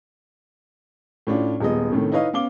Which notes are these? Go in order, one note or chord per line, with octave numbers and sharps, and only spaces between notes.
A2 C#4 D4 F4
D#1 G#3 B3 D#5
A2 C3 D#3 A3 C#4
D#4 E4 B4 C#5 D#5 F5
B3 C#4 F5 D6 G7